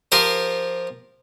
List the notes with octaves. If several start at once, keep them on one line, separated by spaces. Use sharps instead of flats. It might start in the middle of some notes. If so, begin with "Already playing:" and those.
F3 G4 A#4 C5